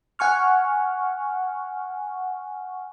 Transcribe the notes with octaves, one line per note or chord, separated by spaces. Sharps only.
F#5 G#5 C#6 F6